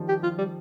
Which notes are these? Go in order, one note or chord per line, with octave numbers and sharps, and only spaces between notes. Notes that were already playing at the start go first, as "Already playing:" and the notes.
Already playing: D#3 F3 G3
G4
F3 F4
G3